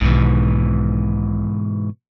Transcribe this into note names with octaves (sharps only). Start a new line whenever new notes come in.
B1 G#2 B2 D#3 E3